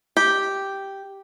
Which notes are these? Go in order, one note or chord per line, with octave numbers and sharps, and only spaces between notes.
G4